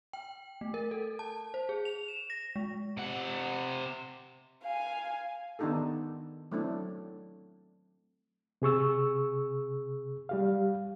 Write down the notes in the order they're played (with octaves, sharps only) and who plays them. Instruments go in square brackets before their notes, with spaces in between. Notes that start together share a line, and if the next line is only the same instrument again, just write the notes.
[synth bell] G5
A3
A#4
A4
A5
C5
G#4
F7
E7
A#6
G#3
[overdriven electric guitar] C3 F#5
[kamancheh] F5 G#5
[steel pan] D#3 B3 D4 D#4 G4 A4
F#3 A3 C4 D4 E4
[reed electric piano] C3 G#4 C#6 E6
G3 G4 F5